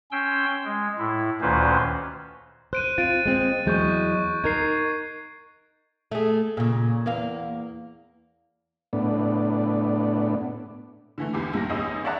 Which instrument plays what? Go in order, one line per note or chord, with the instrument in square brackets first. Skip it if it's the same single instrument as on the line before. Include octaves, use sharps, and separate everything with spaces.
[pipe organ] C#4 G5 C6 E6
G#3
A2 E4
D2 A#2 D#3 C#4 B4 C5
[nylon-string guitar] C5 [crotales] F#6 D7 D#7
[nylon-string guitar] C4 F4 [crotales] A6 D7 D#7
[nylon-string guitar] G#3 C4
[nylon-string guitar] E2 F#3 G#3 [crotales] C#6 G6 D#7
[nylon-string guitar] D#4 A#4 [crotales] G#6 C7
[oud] A3 G#4
A#2 C#3
E2 A#3 F5
[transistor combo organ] A2 B3 D4
[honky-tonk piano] D3 E3 A3
G#1 E2 G4 D6
A#1 G2 G4 A#6
G#1 E2 C#4 D#5 D#6 E6
C#5 D5 E5 F#5 A5 F#6